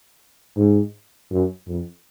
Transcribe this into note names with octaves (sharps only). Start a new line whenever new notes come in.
G#2
F#2
F2